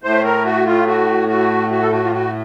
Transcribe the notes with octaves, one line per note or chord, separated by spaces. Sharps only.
A2 A3 C5
A#4
F#4
F4
F#4
F#4
F#4
A4
F#4
F4
F#4